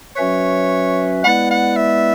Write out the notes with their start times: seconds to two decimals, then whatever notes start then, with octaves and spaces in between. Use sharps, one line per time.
0.16 F#3 C#4 F#4 B4 C#5 E5
1.23 G#3 B3 E4 B4 D5 F#5
1.51 F#5
1.76 E5